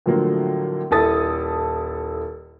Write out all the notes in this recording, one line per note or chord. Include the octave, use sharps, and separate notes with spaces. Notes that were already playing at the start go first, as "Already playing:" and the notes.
A2 D3 F3 F#3 A#3
D#1 E4 A4 D#6 A6